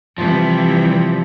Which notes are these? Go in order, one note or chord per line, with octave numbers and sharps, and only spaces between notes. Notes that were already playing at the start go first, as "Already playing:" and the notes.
C3 E3 F3 G3